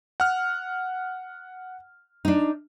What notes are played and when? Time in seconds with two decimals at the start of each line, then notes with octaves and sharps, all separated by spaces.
0.20 F#5 F6
2.25 D4 D#4